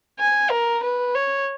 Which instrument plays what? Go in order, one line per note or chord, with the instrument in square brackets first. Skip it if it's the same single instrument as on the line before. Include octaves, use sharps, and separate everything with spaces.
[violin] G#5
A#4
B4
C#5